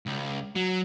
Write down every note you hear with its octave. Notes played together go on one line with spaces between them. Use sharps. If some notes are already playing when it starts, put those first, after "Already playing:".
C#2
F#3